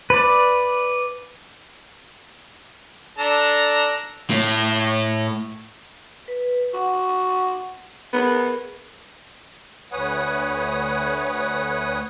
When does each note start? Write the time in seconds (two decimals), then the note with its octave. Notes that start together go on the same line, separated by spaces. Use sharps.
0.10 B4 D5
3.18 D4 A4 A#5
4.30 A2
6.28 B4
6.74 F#4 F#5
8.13 B3 G#4 A#4
9.92 D2 B4 C#5 F#5 G#5 D#6